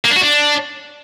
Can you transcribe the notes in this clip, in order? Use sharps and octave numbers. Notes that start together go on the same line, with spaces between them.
A#3
D4
F#4
D4